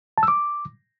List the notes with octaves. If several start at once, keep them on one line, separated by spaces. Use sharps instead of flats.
A5
E6
D6